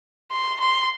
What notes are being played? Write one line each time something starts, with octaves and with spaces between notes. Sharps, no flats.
C6
C6